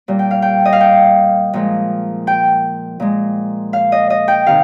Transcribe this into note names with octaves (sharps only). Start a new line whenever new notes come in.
A#2 G3
G5
F5
G5
D#5
F5
G5
A#2 F3 G#3
G5
A#2 G#3
F5
D#5
D#5
G5
C3 D#3 F5